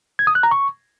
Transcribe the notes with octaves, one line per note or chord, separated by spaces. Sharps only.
G#6
D#6
F#6
A#5
C#6